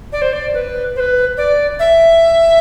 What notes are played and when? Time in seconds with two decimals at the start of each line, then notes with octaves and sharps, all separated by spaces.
0.13 D5
0.22 C5
0.33 D5
0.54 B4
0.96 C5
1.00 B4
1.37 D5
1.79 E5